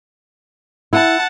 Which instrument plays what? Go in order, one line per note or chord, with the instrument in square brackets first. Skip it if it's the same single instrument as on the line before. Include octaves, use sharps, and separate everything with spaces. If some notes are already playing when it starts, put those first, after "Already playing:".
[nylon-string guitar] E4 [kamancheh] F#5 A5